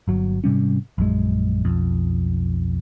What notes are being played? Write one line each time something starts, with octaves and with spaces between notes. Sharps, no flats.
G1 F#3
G#2 C3 G3 C#4
A#1 F#2 G#3
B1 F2